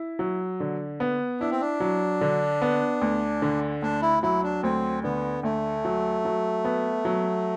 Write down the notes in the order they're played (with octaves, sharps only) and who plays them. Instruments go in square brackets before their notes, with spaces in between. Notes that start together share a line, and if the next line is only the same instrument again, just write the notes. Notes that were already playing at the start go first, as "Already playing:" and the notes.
Already playing: [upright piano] E4
F#3
D3
B3
[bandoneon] D4 [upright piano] E4
[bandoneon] C4
D4
[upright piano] F#3
D3
B3
D2
D3
[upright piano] D2 [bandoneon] D4
[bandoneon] E4
[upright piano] F#3 [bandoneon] E4
[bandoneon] D4
[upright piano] D2 [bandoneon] C4
[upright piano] D3 [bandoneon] B3
[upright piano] D2 [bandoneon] A3
[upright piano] F#3
F#3
B3
F#3